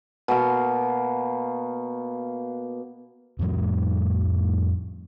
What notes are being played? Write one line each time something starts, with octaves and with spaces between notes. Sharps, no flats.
B2 A#3 F5
F2 A2 F3 G3